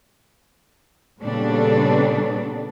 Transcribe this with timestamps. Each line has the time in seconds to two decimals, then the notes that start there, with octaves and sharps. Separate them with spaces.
1.22 A#2 C#3 G3 B3 D4 A4